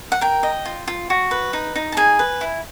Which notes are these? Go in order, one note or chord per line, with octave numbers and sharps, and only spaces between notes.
F#5
A#4 G5
D#5
F4
F4
F#4
B4
D#4
D#4
A5
G#4 G#5
B4
E4